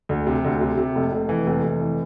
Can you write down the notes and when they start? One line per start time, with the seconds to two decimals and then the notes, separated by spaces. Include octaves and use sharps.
0.09 D2
0.27 C3
0.44 D2
0.61 C3
0.78 C3
0.95 F1
1.12 F1
1.29 E3
1.47 F1
1.63 F1
1.81 E3